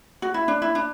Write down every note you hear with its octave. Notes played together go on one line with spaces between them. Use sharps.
F#4
E4
D4
E4
D4